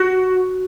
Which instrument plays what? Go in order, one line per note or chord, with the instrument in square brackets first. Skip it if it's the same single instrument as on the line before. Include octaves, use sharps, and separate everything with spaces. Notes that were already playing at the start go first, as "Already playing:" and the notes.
Already playing: [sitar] F#4